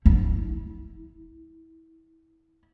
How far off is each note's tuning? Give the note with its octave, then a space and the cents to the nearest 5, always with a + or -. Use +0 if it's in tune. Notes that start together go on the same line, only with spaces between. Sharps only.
E4 -25